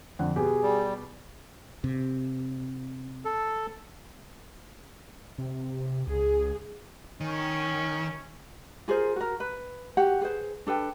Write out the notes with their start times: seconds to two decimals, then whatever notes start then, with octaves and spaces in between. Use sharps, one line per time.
0.19 F2 D3 F#5
0.36 B2 B3 G4 G#4
0.63 G3
1.84 C3
3.25 A4
5.38 C3
6.07 C#2 G#4
7.20 D#3 C#4
8.88 F4 G#4 A#4 C5
9.16 F#4 A#4
9.40 B4
9.97 F#4 G4 F#5
10.21 G#4 B4 C5
10.67 D4 A4 B4 G5